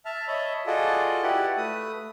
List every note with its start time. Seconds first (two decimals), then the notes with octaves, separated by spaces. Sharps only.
0.05 E5 A5 F6
0.28 C#5 D#5 E5 A5 B5
0.66 F4 F#4 G#4 A4 D5 D#5
1.23 E4 F#4 G4 B4 D5 F#5
1.58 A3 B4 D#6